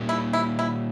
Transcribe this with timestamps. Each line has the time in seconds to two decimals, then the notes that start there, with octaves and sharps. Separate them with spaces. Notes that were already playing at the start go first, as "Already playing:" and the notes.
Already playing: A#2 G3 A#3
0.09 E4
0.33 E4
0.59 E4